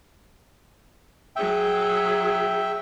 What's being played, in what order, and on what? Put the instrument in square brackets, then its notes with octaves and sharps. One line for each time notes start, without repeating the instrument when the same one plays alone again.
[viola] F#3 G#4 [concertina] E5 G5